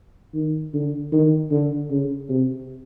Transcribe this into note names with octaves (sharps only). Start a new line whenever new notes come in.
D#3
D3
D#3
D3
C#3
C3